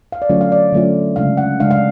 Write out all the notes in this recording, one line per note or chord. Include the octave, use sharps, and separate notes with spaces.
F5
D5
D3 F#3 A3 C#4 F4 C#5
F5
D5
D3 F#3 A3 C#4 F4
C#3 G#3 D4 F5
F#5
C#3 G#3 D4 F5
F5